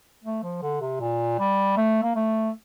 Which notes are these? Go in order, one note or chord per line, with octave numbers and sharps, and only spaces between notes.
A3
F3
D3
C3
A#2
G3
A3
A#3
A3